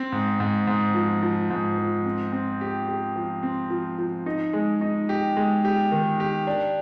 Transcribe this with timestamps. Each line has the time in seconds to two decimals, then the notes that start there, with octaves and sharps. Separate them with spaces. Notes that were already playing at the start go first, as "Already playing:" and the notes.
Already playing: C4
0.12 G#2
0.40 G#2
0.67 G#2
0.95 F3
1.22 F3
1.50 G#2
1.78 F3
2.05 C4
2.32 C4
2.61 G4
2.88 G4
3.16 F3
3.43 C4
3.70 F3
3.99 F3
4.26 D#4
4.53 G#3
4.81 D#4
5.09 G4
5.37 G#3
5.65 G4
5.91 D#3
6.20 G4
6.47 D4